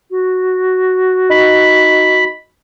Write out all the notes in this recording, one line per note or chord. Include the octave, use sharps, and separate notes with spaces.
F#4
D#4 B5